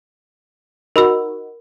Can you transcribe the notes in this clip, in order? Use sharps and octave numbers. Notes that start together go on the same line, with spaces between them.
D#4 F#4 A#4 B5 E6